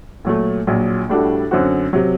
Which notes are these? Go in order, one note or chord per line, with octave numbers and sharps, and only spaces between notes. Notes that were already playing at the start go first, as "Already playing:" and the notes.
A#2 F#3 A3
A#1 A#2 F#3
A2 G3 D4 F#4 A4
F#2 D3 F#3 C4 F#4
C3 F#3